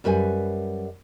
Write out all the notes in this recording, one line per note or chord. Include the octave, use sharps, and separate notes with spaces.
F#2 G3 B4 E5 G#5